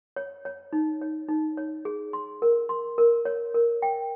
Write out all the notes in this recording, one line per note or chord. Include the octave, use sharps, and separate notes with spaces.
C#5
C#5
D#4
C#5
D#4
C#5
G#4
C6
A#4
C6
A#4
C#5
A#4
G5